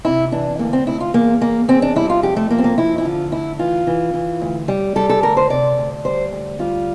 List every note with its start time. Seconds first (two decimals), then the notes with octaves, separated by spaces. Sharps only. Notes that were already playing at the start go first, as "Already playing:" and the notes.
0.05 C3 E4
0.32 E3 D4
0.59 D2 A#3
0.73 C4
0.87 D2 E4
1.00 F4
1.14 E2 A#3
1.41 E2 A#3
1.68 E2 C4
1.82 D4
1.96 G3 E4
2.10 F4
2.23 F2 G4
2.36 A3
2.50 F3 A#3
2.58 C4
2.64 A#3
2.78 F3 E4
2.98 E4
3.05 D3 F4
3.32 D2 E4
3.59 E3 F4
3.87 E3
4.14 E3
4.41 D2
4.68 G3
4.96 G3 A4
5.09 A4
5.23 D2 A#4
5.37 C5
5.50 C3 D5
5.78 D2
6.05 G3 C5
6.32 D2
6.59 G3 F4